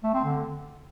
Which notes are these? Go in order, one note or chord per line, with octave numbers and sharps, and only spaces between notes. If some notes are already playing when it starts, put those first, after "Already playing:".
A3
C4
D3